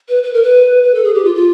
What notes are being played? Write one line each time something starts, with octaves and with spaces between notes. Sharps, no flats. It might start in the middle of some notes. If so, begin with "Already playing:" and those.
B4
B4
A#4
B4
B4
A4
G#4
G4
F4
F4